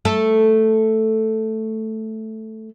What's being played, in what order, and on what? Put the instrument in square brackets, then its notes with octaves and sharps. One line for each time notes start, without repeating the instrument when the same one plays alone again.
[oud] A3 A4